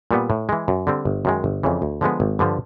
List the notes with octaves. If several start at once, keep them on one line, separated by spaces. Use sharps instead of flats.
A#2 G3 B3
A2
E3 G#3
F#2
D3 G3 C4
G1
F#2 D#3 G#3
G1
F2 C#3 E3
D2
D3 F3 G#3 B3
G#1
G2 D3 F3